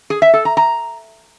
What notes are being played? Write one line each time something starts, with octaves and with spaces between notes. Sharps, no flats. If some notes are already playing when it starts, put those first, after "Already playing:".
G#4
E5
A4
A#5
A#5